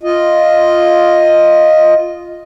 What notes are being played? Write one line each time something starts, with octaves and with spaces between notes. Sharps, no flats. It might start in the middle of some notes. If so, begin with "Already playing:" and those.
F4 D#5